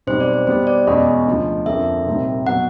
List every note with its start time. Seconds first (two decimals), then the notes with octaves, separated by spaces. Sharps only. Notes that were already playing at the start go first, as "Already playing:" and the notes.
0.07 B1 B2 G3 C4 C5
0.20 D5
0.33 C5
0.47 B2 G3 B3 C5
0.67 D5
0.87 E2 B2 G#3 C#4 F#4 D#5
1.27 D2 C#3 F3
1.66 F2 D3 F3 A#3 C#4 E5
2.06 C2 A#2 G3 C4 D#4
2.46 B2 F#3 B3 F#5